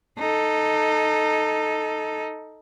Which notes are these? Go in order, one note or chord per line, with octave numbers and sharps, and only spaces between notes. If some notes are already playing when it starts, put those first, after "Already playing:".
D#4 A4